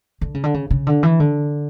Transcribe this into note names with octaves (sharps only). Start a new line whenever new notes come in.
D3
C#3
D3
C#3
C#3
D3
E3
D3